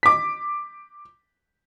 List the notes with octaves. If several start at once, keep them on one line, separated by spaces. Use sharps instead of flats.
D6 B6